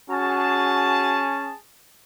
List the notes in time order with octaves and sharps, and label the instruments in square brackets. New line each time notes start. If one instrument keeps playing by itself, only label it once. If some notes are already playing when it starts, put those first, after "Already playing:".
[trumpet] C#4 [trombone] F#4 [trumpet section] G#4 A5